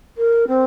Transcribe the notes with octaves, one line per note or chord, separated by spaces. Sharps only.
A#4
C4